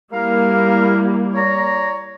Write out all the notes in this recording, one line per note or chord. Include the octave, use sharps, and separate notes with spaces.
G3 A#3 E4 A#4 F5
C#5 D5 A#5